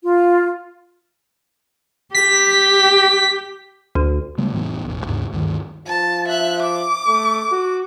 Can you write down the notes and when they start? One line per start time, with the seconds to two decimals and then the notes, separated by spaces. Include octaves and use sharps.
0.03 F4
2.15 G4 B6
3.95 D2
4.38 C#3 G3 G#3 A#3
4.52 F1 A2 E3 B3
4.85 E1 A1 E2
5.06 D#2 G#2 C#3
5.32 D2 G2 D#3
5.87 F3 A5
6.29 E5 F#6
6.62 D6
7.07 A3
7.52 F#4